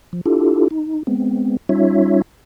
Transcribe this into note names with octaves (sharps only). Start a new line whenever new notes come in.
F3
D4 E4 F4 G4 A4
D#4
G#3 B3 C4
G3 C#4 D#4 F4 C#5 E5